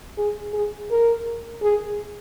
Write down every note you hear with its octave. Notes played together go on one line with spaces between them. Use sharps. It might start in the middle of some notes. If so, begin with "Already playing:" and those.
G#4
G#4
A#4
G#4